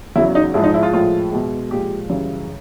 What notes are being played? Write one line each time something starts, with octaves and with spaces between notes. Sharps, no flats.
E2 C#3 F#3 E4
D#4
G#2 F3 G#3 E4
D#4
E4
F4
A2 F3 G#3 F4
B2 G#3
A#2 F3 G#3 G4
F#2 C#3 E3 G3